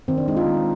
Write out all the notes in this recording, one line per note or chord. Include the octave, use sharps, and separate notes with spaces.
D#3 C4
D4
G#3 D#4
F4
D#3 C4